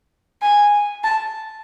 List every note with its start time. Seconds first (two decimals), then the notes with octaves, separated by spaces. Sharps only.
0.42 G#5
1.04 A5